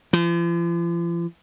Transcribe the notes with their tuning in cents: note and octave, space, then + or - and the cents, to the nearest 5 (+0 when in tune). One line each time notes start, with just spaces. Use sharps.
F3 -45